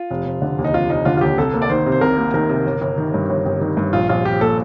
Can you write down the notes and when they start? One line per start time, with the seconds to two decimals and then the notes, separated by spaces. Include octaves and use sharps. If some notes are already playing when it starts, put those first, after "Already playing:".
Already playing: F4
0.10 F1
0.26 F1
0.42 D3
0.58 D#2
0.64 D#4
0.74 F1 F4
0.90 F1 D#4
1.05 D3 F4
1.17 F4
1.21 D#2 G4
1.38 C2 A4
1.54 A#3
1.62 D5
1.70 D#3 C5
1.86 C3
1.92 C5
2.01 C2 A#4
2.17 A#3
2.34 D#3 A#4
2.49 C3
2.65 G1
2.81 G1
2.98 D#3
3.14 G2
3.29 G1
3.45 G1
3.61 D#3
3.77 G2
3.93 A#1 F4
4.09 A#1 F4
4.25 F3 G4
4.41 A#2 A4